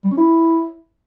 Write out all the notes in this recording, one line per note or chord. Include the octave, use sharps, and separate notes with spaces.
G3
C#4
E4